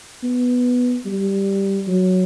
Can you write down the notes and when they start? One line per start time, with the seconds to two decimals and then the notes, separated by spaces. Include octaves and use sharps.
0.23 B3
1.06 G3
1.88 F#3